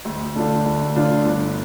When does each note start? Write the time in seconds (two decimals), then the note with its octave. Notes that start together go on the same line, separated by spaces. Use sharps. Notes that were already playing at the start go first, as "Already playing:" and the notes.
0.05 D2
0.35 D3 A3 D4 F4
0.65 D2
0.96 D3 A3 D4 F4
1.25 G1